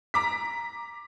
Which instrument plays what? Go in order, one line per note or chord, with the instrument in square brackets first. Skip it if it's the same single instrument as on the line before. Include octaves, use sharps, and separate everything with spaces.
[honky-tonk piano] A#5 D6 B6